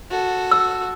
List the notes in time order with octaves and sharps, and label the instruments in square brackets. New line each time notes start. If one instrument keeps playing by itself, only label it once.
[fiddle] F#4 A4
[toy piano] E6